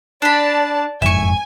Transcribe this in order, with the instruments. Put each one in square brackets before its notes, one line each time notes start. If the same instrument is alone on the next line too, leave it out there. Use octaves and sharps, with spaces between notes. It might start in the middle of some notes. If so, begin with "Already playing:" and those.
[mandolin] D4 B5 [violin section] D5 A5
[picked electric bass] F#1 F2 G#2 [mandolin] E5 C#6 [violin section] G#5